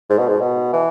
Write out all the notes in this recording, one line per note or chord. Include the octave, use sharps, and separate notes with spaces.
G#2
B2
G#2
B2
E3